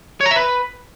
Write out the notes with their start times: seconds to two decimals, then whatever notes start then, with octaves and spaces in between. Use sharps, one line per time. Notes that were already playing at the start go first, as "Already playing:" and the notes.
0.21 C#5
0.26 A#5
0.31 E5
0.36 B4